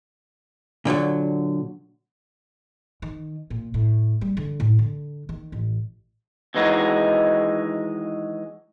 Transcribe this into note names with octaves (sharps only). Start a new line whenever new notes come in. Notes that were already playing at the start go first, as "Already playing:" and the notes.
A#2 D3 F3 F#3
D#3
A#2
A2
G3
D3
A2
D3
D#3
A1
D#2 E3 G#3 D#4 F#4